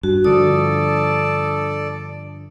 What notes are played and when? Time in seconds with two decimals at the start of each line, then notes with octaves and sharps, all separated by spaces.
0.03 G2 F#4
0.24 G2 D3 F3 A4 D5 D#6